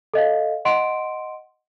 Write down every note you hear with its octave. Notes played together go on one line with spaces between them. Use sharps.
A4 D#5 F5
D#5 F#5 C6 D7